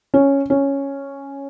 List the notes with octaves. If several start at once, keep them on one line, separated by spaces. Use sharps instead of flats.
C#4
C#4